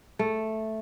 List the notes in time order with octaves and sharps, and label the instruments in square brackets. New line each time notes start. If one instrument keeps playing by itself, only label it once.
[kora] A3